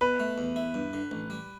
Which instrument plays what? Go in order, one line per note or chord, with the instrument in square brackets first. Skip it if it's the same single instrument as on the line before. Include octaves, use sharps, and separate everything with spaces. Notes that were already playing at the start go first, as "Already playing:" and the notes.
[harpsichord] B2 [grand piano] B4
[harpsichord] A3
E2
E4
G2
D3
A1
G3